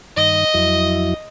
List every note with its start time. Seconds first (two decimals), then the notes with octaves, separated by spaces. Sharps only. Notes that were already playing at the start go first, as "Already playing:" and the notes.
0.17 G2 D#3 D#5
0.54 F2 F#3 E4